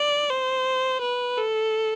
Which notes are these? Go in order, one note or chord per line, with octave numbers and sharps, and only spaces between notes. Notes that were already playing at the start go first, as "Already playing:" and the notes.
Already playing: D5
C5
B4
A4